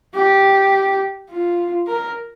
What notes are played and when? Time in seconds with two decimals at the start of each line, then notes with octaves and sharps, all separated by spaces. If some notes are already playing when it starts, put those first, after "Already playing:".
0.14 G4
1.30 F4
1.87 A#4